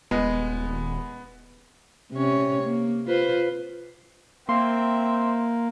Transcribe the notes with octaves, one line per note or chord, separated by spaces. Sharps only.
D#1 G#3 B3
C3 C#4 C#5
A#3
F4 B4 C5
A#3 C4 E5 C6